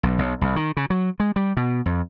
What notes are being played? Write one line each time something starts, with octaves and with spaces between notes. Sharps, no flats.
B1
B1
C2
D#3
C#3
F#3
G#3
G3
B2
F2